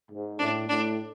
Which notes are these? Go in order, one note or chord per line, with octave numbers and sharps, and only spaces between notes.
G#2
A2 D4
A2 D4